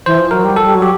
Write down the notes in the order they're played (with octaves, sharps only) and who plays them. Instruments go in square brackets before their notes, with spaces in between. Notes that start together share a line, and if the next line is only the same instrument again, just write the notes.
[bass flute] E3 [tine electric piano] C5
[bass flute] F3
[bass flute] F#3 [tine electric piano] A#4
[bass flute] G3
[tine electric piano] A4
[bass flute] G3
F#3
[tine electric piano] G4